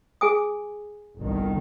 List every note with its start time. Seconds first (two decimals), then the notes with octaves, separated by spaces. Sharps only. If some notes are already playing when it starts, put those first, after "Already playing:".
0.21 G#4 G#5 D#6
1.19 G1 C2 D#3